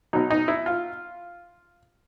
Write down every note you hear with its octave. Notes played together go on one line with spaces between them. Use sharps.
B2 F#3 D#4
D#4
E4
F4